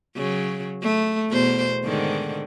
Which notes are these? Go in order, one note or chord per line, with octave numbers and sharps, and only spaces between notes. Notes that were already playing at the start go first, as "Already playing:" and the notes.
C#3 F#3
A3
E2 B2 C5
G#2 D3 D#3